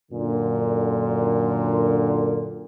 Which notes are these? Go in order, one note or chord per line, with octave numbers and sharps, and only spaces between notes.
F#2 A#2 D3